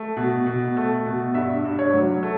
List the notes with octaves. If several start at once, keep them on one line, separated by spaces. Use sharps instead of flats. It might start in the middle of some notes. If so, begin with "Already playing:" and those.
Already playing: A3
B2
B2
A3
B2
G2 E5
G2
C#5
F#3
A3